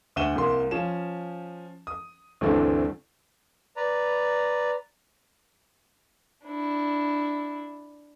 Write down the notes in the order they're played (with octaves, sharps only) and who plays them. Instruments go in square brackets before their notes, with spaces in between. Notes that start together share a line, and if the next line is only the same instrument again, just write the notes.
[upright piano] D2 E5 F#5 D#7 E7 G7
C2 A#3 C6
F3 C#4 E7
D#6
D2 G2 E3 A3 C4 D4
[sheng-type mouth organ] B4 D5 A#5
[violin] D4 E4